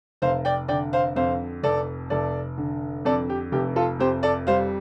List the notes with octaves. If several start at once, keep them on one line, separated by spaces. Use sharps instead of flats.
F1 C5 F5
D5 G5
D3 D5 G5
C5 F5
F2 C5 F5
F1 A4 D5
F1 A4 D5
D3
F2 A4 D5
G4
F1 G4
F4 A4
F2 G4 C5
A4 D5
G3 C5 F5